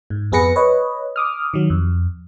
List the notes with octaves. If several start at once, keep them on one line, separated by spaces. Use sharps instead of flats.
G#2
F2 B3 G#4 B4 A#6 C#7
B4 C#5 D#5
D6 D#6 F6
D#3 F#3
F2